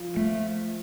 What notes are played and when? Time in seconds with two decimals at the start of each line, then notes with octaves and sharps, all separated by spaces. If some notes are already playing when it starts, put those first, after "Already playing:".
Already playing: F3 F4
0.17 A3